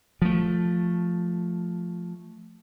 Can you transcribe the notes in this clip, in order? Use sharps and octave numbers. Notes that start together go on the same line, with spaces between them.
F3 A3